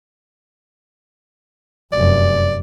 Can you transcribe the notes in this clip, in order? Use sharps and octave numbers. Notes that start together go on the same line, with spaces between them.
F1 F#2 D5